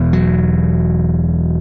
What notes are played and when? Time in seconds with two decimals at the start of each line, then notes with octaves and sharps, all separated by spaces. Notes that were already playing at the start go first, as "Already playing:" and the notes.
Already playing: E1 E2 B2
0.13 F#3